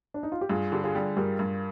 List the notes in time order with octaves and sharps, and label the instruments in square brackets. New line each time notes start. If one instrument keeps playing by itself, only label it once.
[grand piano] D4
D#4
F4
G4
[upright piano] G2 [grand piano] F4 G#4
[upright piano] D3 [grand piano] G4
[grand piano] F4 G#4
[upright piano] G3
[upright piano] G2 [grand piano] G4 A#4
[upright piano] G2